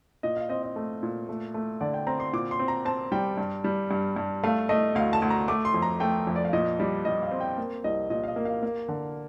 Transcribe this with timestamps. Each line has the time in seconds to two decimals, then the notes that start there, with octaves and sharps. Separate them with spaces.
0.23 A#2 D#5
0.37 F5
0.49 C4 D#5
0.63 D#5
0.76 A3
1.03 A#2
1.29 A3
1.54 A3
1.81 D3 D5
1.94 G5
2.07 C4 A#5
2.20 C6
2.33 A#2 D6
2.51 C6
2.59 C4
2.68 A#5
2.85 C4 A5
3.12 G3 G5
3.38 G2
3.64 G3
3.91 G2
4.16 G2
4.43 A3 F5
4.69 A3 D#5
4.95 D2 F5
5.13 A5
5.22 D2
5.30 A#5
5.48 A3 D6
5.65 C6
5.74 F2
5.82 A#5
6.00 A3 G5
6.27 F2
6.36 D5
6.45 F5
6.53 A#2 D#5
6.79 G3 D5
7.05 G3 D#5
7.23 F5
7.31 C4
7.41 G5
7.58 A#3
7.84 C2 D#5
8.10 A#2 D#5
8.24 F5
8.28 D#5
8.36 A#3
8.45 F5
8.63 A#3
8.89 D3